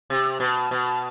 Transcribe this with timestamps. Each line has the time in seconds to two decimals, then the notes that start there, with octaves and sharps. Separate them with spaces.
0.10 C3
0.40 B2
0.71 B2